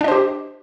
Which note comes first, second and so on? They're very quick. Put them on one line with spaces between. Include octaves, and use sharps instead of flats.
D4 D#5 C5 G4